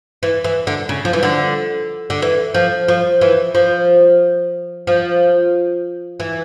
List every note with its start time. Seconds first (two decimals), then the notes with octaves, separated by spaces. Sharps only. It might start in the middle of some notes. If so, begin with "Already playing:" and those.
0.23 E3
0.44 E3
0.67 D3
0.89 C#3
1.05 F3
1.13 E3
1.23 D3
2.10 D3
2.22 E3
2.54 F3
2.88 F3
3.21 E3
3.55 F3
4.87 F3
6.20 E3